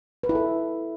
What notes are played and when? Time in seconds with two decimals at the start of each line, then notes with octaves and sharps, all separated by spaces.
0.23 B4
0.29 E4
0.35 A4